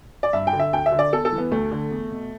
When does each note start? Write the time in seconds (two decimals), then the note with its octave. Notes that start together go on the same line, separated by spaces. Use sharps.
0.23 D5
0.33 G2 E5
0.47 G5
0.53 D3
0.59 E5
0.73 D2 G5
0.86 E5
0.92 D3
0.99 D5
1.12 E2 A4
1.25 A4
1.32 E3
1.38 B3
1.51 D2 A3
1.71 D3
1.91 E2
2.11 B2